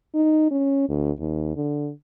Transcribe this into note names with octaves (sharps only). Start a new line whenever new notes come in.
D#4
C#4
D2
D#2
D3